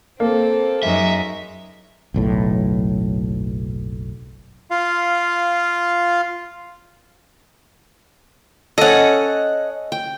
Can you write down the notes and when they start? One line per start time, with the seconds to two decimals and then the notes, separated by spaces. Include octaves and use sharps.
0.20 A#3 C4 A4
0.83 F#2 G#3 D#4 E5
2.14 F#1 B1 A2
4.71 F4 F5
8.78 C#4 A4 D#5 F#5
9.92 G5